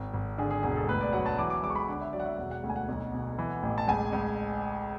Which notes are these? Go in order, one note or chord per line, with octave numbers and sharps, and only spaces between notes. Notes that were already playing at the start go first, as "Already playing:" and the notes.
Already playing: G#1
G#1
D3 G#4
G#4
E1 G#4
A4
D2 B4
D5
F#3 F#5
A5
E3 D6
D6
C#2 D6
C#6
B5
D3 F#5
E5
F#3 D5
F#5
E5
E1 F#5
F#5
D2 F#5
G#5
F#5
B1
B2
E3
A1
A5
C#2 G#5
C#2